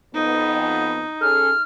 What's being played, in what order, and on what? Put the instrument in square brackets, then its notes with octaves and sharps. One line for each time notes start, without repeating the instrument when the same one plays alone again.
[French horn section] F2 B3 [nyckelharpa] D#4
[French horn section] C#4 G#4 A4 [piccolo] F6